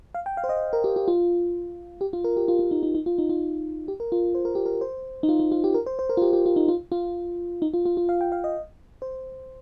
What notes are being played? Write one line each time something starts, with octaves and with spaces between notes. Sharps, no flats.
F5
G5
F5
C5
D#5
A#4
G4
G4
F4
G4
F4
A#4
G4
F4
F4
D#4
D#4
D#4
F4
D#4
F4
G4
A#4
F4
C5
A#4
G4
A#4
C5
D#4
F4
D#4
F4
G4
A#4
C5
C5
A#4
F4
G4
G4
F4
D#4
F4
F4
D#4
F4
F4
F4
F5
G5
F5
D#5
C5